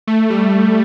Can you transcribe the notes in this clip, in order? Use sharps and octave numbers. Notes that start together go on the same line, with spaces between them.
A3
G3